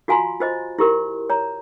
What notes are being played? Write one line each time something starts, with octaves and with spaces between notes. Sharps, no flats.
F4 F#4 F5 G#5 A#5 C6
F4 C5 D#5
E4 G4 A#4 C6
C#5 A#5